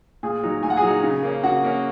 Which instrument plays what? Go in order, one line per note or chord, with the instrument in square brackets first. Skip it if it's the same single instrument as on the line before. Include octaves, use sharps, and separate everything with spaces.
[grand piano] A#2 G#4 G#5
F#3 D#4
A#2 G#5
F#5
G#4 G#5
F#3
D#4
C#3
A#3 C#4
C#3 F#4 F#5
A#3 C#4